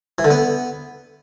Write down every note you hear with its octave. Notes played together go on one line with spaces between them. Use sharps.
E3
D3
B3